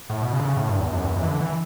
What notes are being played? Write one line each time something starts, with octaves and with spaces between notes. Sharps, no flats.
A2
B2
C#3
D3
C#3
A2
G2
E2
F#2
E2
F#2
E3
D3
E3